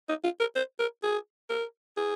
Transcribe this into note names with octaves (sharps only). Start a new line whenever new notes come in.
D#4
F4
A#4
C5
A#4
G#4
A#4
G#4